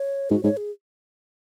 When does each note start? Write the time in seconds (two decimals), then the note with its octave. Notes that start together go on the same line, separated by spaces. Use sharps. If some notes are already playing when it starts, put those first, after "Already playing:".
Already playing: C#5
0.30 G#2 F#4
0.44 G#2 C#5
0.57 G#4